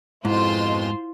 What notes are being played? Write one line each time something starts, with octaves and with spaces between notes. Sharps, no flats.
F2 G#2 B2 G#3 E4 F4 C5 C6